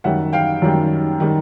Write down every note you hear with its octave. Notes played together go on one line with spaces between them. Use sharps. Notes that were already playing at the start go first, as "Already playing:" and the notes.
F#2 D#3 G3 E5 F#5
F5 G5
F#2 D#3 G3
D#3 G3